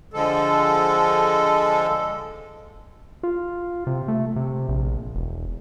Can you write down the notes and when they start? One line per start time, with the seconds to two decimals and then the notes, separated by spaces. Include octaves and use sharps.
0.14 D3 F3 G#3 A4
3.23 F4
3.87 C3
4.08 A3
4.36 C3
4.69 A#1
5.15 E1